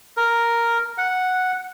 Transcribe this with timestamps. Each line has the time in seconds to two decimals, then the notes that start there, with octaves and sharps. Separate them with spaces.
0.17 A#4
0.98 F#5